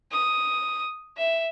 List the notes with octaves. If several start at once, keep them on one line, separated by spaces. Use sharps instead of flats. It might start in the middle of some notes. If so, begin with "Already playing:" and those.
D#6
E5